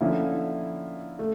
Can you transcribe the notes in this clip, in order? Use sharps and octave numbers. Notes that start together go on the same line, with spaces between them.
D3 F3 A#3 C#4 E4
A3